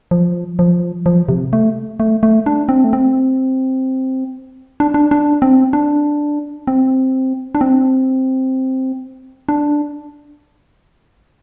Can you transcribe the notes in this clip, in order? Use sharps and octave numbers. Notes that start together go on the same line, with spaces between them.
F3
F3
F3
C3
A3
A3
A3
D4
C4
A3
C4
D4
D4
D4
C4
D4
C4
D4
C4
D4